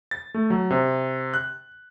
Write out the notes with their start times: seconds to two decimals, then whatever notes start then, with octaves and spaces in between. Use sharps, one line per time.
0.11 A6
0.34 A3
0.50 F#3
0.70 C3
1.34 F#6